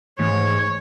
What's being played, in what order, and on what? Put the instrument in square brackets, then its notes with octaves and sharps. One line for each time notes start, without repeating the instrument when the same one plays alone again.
[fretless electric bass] G#1 E3 A3 [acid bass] G#2 [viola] C#5